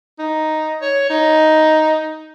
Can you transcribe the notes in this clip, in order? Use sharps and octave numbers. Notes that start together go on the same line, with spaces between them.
D#4
C#5
D#4